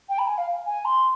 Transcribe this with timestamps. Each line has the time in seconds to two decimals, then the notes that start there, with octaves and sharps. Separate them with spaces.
0.09 G5
0.18 B5
0.27 G#5
0.38 F5
0.66 G#5
0.85 C6